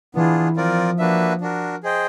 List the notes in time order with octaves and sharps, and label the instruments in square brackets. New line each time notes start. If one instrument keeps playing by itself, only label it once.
[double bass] E3 [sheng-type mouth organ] B3 D4 F4 G#4
[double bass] F3 [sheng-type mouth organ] C4 F4 A#4 D5
[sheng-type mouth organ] A#3 D4 F#4 B4 E5
D4 F#4 A#4
G#4 C5 D#5 G5